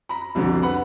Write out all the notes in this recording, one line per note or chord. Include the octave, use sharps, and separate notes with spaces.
A#5 B5
C2 F2 B2 D3
B4 F#5 B5